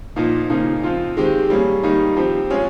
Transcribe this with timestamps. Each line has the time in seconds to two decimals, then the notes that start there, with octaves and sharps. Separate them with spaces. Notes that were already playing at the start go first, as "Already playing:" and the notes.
0.16 A#2 F3 A#3 D#4
0.50 C#3 F3 A#3 D#4
0.83 F3 C4 F4
1.17 D#3 G#3 C4 G4
1.50 G3 A#3 C#4 G#4
1.83 D#3 G3 A#3 D#4
2.16 F3 C4 G4
2.50 G#3 C#4 F4 G#4